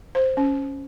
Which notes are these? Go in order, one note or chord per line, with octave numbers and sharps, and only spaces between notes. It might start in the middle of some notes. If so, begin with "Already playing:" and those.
C5
C#4